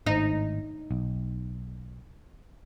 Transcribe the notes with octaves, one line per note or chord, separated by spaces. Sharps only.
G#1 A2 D#4
B1